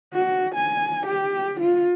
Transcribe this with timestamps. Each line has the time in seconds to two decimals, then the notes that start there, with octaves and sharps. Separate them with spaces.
0.14 F#4
0.55 G#5
1.07 G4
1.60 F4